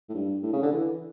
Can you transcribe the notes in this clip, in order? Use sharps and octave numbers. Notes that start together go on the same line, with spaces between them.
A2
G2
A2
C#3
D3
E3